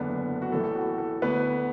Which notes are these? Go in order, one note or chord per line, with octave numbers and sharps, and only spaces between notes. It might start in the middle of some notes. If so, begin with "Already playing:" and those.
Already playing: F#1 E2 D3 B3 D4
F#4
A1 A2 E3 A3 A4
A4
F#4
A4
D2 D3 B3 B4